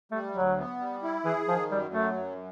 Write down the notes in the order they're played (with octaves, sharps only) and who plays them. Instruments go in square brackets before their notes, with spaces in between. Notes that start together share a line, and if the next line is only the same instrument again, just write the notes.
[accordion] G3 [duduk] A3
[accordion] D2 [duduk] F#3
[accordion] B3
G3
E4
[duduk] E3 [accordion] G#4
[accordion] D#3 [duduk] F3
[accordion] F#2 [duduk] G3
[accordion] F#3 [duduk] A3
[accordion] F#2